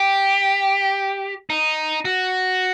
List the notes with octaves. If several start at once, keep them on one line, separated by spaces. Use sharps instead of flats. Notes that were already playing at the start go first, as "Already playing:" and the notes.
Already playing: G4
D#4
F#4